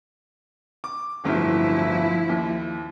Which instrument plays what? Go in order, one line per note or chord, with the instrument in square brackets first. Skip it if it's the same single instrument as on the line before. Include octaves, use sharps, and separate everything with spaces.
[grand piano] D6
[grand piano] D1 G1 [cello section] F3 E4
[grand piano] D#2